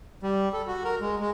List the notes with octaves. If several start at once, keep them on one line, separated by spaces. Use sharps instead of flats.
G3
A4
F#4
A#4
G#3
G#3